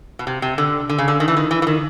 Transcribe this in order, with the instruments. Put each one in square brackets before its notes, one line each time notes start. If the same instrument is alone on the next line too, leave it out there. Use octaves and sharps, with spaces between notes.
[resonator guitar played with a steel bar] B2
C3
C3
D3
D3
C#3
D3
D#3
E3
D#3
E3
E3
D#3